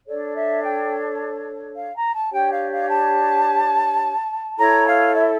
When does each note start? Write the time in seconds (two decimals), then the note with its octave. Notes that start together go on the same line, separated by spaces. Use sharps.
0.06 D4 A4 C#5 D5
0.34 E5
0.62 G5
1.75 F5
1.94 A#5
2.13 A5
2.31 D4 G4 C#5 G5
2.51 F5
2.70 F5
2.89 A5
4.57 E4 A4 C#5 A#5
4.86 F5
5.14 E5